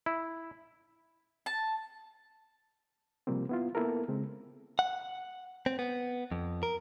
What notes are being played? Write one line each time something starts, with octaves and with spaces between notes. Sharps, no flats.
E4
A5
C3 F3 G3 A#3 C4
B3 E4 F4
A#3 B3 E4 A4 A#4
C#3 G#3 C4
F#5
C4
B3
F2
A#4